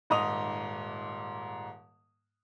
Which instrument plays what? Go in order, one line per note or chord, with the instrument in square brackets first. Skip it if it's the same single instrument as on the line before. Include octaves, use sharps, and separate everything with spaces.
[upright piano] D#1 G#2 D#5 D#6 F7